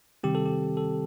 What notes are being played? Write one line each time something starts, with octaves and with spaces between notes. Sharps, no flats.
C3 D#3 G3 C4 G4
A4
G4
A4